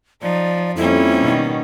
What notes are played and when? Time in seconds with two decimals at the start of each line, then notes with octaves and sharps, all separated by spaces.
0.22 F3 D#4 D5
0.76 F2 G3 A#3 C#4 E4
1.20 B2 D#3